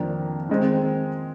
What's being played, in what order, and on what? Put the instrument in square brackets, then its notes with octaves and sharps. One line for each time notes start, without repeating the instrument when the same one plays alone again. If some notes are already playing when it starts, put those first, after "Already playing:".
Already playing: [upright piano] F2 D#3 A#3 D4
D#3 G#3 C4